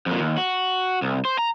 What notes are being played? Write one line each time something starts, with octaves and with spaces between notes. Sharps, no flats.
F2 A#2
D#2
F#4
C2
C5
A#5